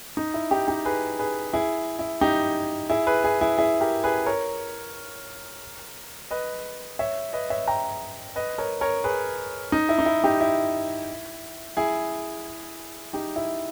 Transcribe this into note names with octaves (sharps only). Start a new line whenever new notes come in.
D#4
E4
D#4 G4
D#4 G4
G#4 B4
G#4 B4
E4 G#4
E4
D#4 G4
E4 G#4
G#4 B4
E4 G#4
E4 G#4
E4 G#4
G4 A#4
G#4 B4
A#4 C#5
B4 D#5
C#5 E5
B4 D#5
C#5 E5
G5 A#5
B4 D#5
A#4 C#5
A#4 C#5
G#4 B4
D#4
E4
D#4
E4
D#4 G4
E4
E4 G#4
D#4 G4
E4